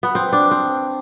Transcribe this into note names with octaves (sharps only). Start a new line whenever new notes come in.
B3
C4
D4
C4